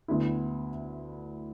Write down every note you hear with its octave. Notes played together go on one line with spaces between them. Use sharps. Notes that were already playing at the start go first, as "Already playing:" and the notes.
D2 D3 B3 E4